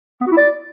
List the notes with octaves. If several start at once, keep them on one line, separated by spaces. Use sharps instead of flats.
B3
F#4
E4
D5